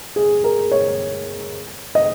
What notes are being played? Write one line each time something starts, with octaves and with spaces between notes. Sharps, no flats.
G#4
A#4
C#5
D#5